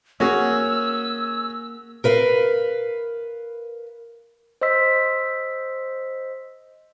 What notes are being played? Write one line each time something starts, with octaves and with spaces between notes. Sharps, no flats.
A#3 C#4 F#4 G#4 E6
A#4 B4 F5
C5 D#5 C6 E6 B6